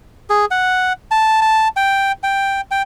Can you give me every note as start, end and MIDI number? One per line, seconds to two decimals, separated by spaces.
0.30 0.45 68
0.51 0.93 78
1.11 1.41 81
1.42 1.68 81
1.77 2.12 79
2.23 2.61 79
2.71 2.82 79